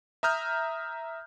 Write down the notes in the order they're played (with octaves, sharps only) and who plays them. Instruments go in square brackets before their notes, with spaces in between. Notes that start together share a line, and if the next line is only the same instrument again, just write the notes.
[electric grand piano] E5 A#5 D#6 F6 G6